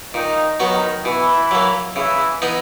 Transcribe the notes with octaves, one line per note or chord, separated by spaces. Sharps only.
A#2 D#3 D#4
D#3 F#3 B3 D#4 F#4
B2 E3 E4
F#3 A#3
C#3 E3 E4
E3 B3 D#4